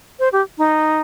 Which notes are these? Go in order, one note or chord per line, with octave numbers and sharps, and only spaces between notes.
C5
G4
D#4